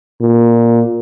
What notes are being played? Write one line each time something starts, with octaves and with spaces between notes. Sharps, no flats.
A#2